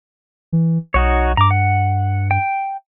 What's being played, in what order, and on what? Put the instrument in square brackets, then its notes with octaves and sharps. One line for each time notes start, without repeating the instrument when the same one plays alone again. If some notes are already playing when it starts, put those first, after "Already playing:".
[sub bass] E3
[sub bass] B1 [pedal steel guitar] D#4 F#4 C#5
[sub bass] G2 [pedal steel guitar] A#5 D6
[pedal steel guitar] F#5
G5